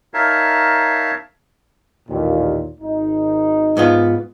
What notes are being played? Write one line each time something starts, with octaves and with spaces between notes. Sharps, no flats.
D#4 A#4 C#5 E5 F5 A5
A1 D#2 A#2
G#1 D#4
G#2 B3 F4